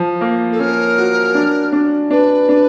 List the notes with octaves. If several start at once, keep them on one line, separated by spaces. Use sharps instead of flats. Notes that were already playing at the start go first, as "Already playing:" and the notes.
Already playing: F3
A#3
A4
C#4 A#4
F#4
D4
D4
D4 B4
D4